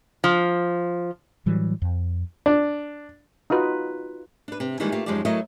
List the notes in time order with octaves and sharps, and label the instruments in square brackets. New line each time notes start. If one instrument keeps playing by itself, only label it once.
[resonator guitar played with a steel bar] F3
[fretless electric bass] A2 E3 F#3 G3
F2
[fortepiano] D4
[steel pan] D#4 F4 F#4 B4
[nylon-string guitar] D4 B4
C3
D#3 E3 G3 G#3 A#3 F4
A3 A#3 F4 G4
F#2 F3 G#3 D#4 G4 D5
F#3 A3 E4 A#4 D#5